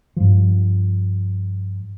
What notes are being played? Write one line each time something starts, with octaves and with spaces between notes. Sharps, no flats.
G2 F3